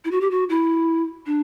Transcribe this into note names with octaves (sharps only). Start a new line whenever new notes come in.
E4
F#4
G4
F#4
E4
D4